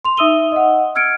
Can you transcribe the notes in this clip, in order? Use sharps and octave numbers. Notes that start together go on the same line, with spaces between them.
C6 F7
D#4 E5 D#6 E6 D#7 G7
D#5 F#5
E6 F6 G#6 C#7 D7